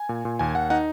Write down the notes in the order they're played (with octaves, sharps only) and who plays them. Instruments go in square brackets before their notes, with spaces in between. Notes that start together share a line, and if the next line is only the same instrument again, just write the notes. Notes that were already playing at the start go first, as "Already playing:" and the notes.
Already playing: [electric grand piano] G#5
A#2
A#2
D#2 G#5
D#2 F#5
D#4 F#5